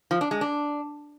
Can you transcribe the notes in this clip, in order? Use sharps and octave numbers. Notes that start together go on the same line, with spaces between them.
F3
D4
G#3
D4